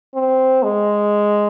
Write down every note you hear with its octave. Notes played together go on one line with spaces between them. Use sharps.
C4
G#3